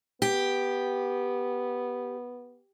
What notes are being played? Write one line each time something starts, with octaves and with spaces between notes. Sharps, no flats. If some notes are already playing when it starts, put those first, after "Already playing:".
B3 G4